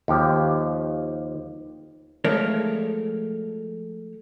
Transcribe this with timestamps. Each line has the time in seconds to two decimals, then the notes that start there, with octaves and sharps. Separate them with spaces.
0.08 D#2 F3 G4
2.24 F3 G#3 A3 A#4 C#5